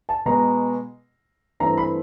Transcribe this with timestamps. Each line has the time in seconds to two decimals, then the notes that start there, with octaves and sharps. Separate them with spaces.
0.09 A5
0.26 B2 G#3 B3 A#5
1.60 G2 E3 A3 C4 A#5
1.77 B5